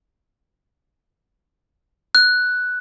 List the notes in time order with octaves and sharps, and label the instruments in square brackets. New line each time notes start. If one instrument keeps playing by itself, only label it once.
[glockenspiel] F#6